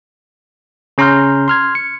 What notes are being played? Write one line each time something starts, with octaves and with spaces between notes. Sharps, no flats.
C#3 C#4 A#5 C6 F6 G6
C6 F6 G#6
C#7